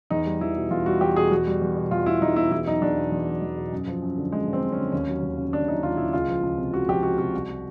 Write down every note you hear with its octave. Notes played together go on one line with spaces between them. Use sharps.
E2 D#4
G3
E2 E4
B2
E2 F4
G3 F#4
E2 G4
B2 G#4
E2 F#4
G3
E2
B2
E2 F4
G3 E4
E2 D#4
B2 E4
E2 E4
F#3 D#4
E2 D4
B2
E2
F#3
E2
B2
F#2
F3
F#2
D3
F#2 G#3
F3
C4
F#2
C#4
D3
D#2 C#4
F#3
D#2
C#3
D#2 D4
F#3 D#4
D#2 F4
C#3 E4
C#2 F4
F3
C#2
C3
C#2 F#4
F3 G4
C#2 F#4
C3 F#4
C2
G3